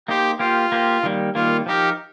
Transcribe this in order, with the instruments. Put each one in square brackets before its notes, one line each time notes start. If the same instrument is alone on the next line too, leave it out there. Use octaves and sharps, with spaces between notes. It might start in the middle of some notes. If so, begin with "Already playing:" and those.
[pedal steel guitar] A#3 D#4 C5 [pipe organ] G4
[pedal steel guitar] A#3 G4 C5 [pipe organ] F4
[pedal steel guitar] A#3 G4 C5
D#3 G3 A#3
[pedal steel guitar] D#3 G3 A#3 [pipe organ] F4
[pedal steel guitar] F3 D#4 A#4 [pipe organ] G4